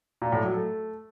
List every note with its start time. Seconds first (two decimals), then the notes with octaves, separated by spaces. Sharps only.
0.22 A#2
0.32 A2
0.43 F#3
0.54 A3